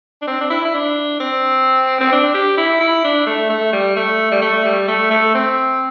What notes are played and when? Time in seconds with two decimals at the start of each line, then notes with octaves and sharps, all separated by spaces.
0.22 D4
0.27 C4
0.41 D4
0.51 E4
0.65 E4
0.75 D4
1.20 C4
2.01 C4
2.13 D4
2.35 G4
2.58 E4
2.80 E4
3.04 D4
3.27 A3
3.50 A3
3.73 G3
3.96 A3
4.32 G3
4.42 A3
4.65 G3
4.88 A3
5.11 A3
5.35 C4